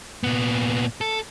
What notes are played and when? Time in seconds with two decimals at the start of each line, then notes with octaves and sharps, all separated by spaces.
0.24 A#2 B3
1.01 A4